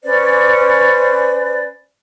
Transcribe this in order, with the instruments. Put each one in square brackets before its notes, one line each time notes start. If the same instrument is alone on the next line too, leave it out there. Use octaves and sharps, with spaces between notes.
[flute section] C#4 B4 C5 D5